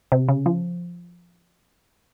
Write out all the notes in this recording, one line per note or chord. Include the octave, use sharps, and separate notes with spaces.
C3
C#3
F3